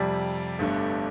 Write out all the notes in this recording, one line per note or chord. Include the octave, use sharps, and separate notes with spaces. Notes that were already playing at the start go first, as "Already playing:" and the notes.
Already playing: F2 C3 G3 D5
G1 G2 D3 A3